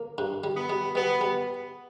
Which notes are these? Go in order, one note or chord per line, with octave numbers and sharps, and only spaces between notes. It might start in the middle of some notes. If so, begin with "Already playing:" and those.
Already playing: A#3
G2
G3
B3
G3
G3 B3
G3